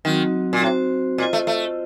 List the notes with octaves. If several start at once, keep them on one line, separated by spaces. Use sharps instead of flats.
D#3 F#3 C4 F#4
A#2
A2 C4 F#4 C5
A#2 F4 C5 D#5
A3
A3